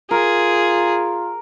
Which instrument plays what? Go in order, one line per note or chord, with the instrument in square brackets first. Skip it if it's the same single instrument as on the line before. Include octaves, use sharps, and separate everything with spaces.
[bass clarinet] F4 [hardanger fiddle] G#4 [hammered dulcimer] A#4